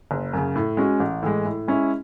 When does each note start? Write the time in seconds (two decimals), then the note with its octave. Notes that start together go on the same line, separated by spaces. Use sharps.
0.11 F#1
0.33 F#2 C#3
0.56 A2
0.77 G#3 C#4 F#4
1.00 A1
1.23 A2 E3 G#3
1.46 A2
1.68 G#3 C#4 E4